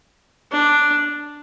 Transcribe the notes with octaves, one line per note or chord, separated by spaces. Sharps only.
D4